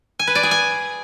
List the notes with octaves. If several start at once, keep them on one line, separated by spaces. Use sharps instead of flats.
G#5
B4
D5
G#4
G#5